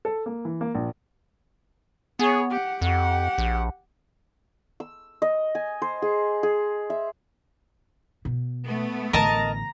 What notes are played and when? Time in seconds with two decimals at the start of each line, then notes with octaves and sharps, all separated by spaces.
0.05 A4
0.26 A#3
0.45 E3
0.61 A#3
0.75 A#1
2.19 B3 G#4 C#5
2.51 G4 F#5
2.81 F2 G4 F#5
3.38 A#1
4.80 E6
5.22 D#5
5.55 G#5
5.82 C5
6.02 G#4
6.43 G#4
6.90 E5
8.25 B2
8.67 A3 B3
9.13 A1 D3 A#4 D#5 A5 A#5 A#6